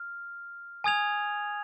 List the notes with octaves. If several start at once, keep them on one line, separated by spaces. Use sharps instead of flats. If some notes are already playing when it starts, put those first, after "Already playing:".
Already playing: F6
G#5 D#6 G#6 F7